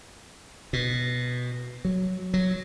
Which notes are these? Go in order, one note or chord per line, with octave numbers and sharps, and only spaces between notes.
B2
F#3
F#3